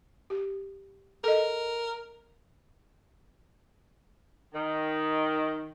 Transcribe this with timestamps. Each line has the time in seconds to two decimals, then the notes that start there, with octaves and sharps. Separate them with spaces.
0.30 G4
1.24 A4 A#4 D#5
4.54 D#3